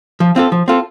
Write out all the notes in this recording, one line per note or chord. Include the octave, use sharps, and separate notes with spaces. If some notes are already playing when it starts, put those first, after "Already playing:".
F3
C4 F4 A4
F3
C4 F4 A4